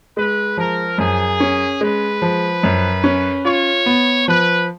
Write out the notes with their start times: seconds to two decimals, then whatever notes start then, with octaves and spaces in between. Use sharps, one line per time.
0.17 G#3 B4
0.57 F3 A#4
0.98 F#2 G#4
1.40 C#4
1.81 G#3 B4
2.22 F3
2.63 F#2
3.04 C#4
3.45 F4 C#5
3.86 B3
4.28 F3 B4